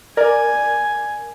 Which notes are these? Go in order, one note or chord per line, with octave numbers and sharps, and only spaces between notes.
A#4 D5 G#5